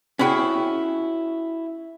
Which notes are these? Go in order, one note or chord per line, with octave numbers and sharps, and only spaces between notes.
C#4 E4 F#4 G#4 G5